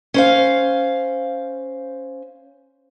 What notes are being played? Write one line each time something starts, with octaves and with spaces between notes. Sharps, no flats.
C#4 C5 F5